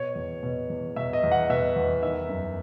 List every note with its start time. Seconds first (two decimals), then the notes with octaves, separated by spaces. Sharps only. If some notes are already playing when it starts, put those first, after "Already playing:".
Already playing: B2 C#5
0.15 E2
0.43 B2
0.70 E2
0.96 B2 E5
1.13 D#5
1.23 E2
1.32 F#5
1.50 B2 E5
1.76 E2
2.03 D#3 E5
2.29 F#2